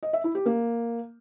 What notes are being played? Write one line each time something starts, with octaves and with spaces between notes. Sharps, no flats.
D#5
E5
E4
G4
A#3